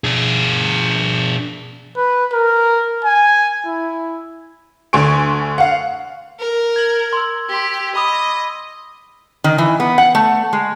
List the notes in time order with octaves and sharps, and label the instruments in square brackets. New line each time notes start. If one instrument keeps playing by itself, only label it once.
[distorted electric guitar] D4 G#4
[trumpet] B4
A#4
G#5
E4
[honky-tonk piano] D2 D3 G#5 C6 C#6 D7
F5 F#5
[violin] A#4
[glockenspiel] G#6 F#7
C6 E6
[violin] G4 [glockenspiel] C6 B6 G7
[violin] D#5 [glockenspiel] B5 D6 D#6
[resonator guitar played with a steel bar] D#3
E3
B3
F#5
A3
G#3